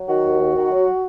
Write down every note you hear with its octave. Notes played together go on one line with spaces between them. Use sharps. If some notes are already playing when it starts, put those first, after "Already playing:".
Already playing: F#3
D#3 F#4
D#2
D#3
D#3
F#3